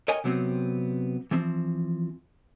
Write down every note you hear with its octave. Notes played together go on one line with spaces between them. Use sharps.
A#4 C#5 D#5 G5 G#5
C3 F#3 B3 C4
E3 F3 C4